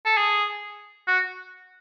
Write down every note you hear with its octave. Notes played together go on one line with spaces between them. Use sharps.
A4
G#4
F#4